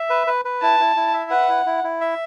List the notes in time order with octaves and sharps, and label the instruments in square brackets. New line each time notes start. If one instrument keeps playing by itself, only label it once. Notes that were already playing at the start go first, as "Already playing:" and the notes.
Already playing: [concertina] E5
B4
B4
B4
[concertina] E4 [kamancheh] A5
[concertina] E4
E4
E5
[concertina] B4 [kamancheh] F#5
[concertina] E4
E4
E4
E5